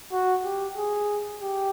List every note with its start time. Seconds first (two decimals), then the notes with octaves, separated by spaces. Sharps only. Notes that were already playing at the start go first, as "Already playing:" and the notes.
0.12 F#4
0.44 G4
0.77 G#4
1.42 G4